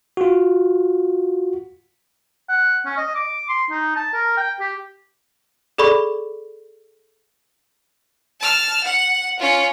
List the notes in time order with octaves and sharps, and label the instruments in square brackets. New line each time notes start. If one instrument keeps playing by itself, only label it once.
[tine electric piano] F4 F#4
[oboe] F#5
C#4
D#5
D6
C6
D#4
A5
A#4
G5
G4
[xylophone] G#4 A4 D5 B5 C#6
[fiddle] A5 F6
F#5
C#4 F4